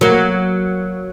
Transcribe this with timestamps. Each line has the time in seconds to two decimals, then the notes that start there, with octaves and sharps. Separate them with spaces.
0.01 F#3 A#3